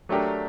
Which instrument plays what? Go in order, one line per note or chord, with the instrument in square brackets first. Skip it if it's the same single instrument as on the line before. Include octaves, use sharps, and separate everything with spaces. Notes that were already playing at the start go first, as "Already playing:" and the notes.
[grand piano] F#3 A3 D4 G4 A#4